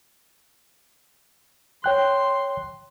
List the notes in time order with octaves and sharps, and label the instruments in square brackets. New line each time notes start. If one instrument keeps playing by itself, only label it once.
[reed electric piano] C#5 G5 F#6 [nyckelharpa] C6